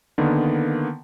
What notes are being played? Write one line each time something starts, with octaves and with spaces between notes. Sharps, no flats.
D3 D#3 A#3 B3